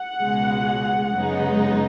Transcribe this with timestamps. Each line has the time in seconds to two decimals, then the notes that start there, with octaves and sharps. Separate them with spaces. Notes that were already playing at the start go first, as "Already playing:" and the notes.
Already playing: F#5
0.19 C#2 B2 G#3
1.15 F#2 C#3 G#3 B3 D#4